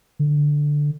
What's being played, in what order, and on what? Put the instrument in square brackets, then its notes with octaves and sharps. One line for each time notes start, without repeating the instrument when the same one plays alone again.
[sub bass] D3